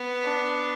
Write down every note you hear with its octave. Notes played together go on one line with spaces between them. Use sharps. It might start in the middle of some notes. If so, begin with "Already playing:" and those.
Already playing: B3
D4